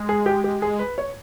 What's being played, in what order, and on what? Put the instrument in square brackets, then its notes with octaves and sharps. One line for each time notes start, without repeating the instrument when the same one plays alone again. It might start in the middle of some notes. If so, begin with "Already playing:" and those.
Already playing: [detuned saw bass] G#3
[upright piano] G#4
G4
G4
G#4
B4
C#5